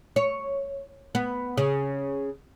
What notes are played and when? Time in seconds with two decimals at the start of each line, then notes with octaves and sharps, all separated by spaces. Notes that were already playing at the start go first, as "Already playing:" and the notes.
0.16 C#5
1.15 B3
1.57 C#3